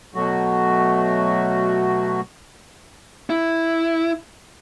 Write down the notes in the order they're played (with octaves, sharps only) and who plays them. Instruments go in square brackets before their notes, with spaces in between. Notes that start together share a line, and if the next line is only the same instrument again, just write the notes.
[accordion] B2 F#3 A3 F#4
[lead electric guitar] E4